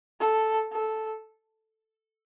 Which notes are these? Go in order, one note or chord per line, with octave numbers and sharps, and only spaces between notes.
A4
A4